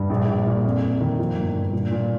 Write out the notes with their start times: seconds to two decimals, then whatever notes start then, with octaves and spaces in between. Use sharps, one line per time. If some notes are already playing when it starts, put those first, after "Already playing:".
Already playing: G2
0.10 A#1
0.28 A#1
0.46 A#2
0.65 F2
0.82 F2
1.01 D#3
1.19 F3
1.37 G1
1.55 G2
1.73 A#2
1.91 A#2